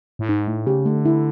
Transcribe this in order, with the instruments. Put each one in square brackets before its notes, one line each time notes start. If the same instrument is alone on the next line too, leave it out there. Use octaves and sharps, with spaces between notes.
[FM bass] A2
[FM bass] G#2 [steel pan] D#4
[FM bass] A2 [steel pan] A3
[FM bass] C#3 [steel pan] G4
[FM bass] D3 [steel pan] A3
[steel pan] E4